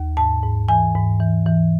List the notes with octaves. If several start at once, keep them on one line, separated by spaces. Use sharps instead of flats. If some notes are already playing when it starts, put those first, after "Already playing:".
Already playing: D#2
G#2 A5
G#2
E3 G#5
G#2
E3
E3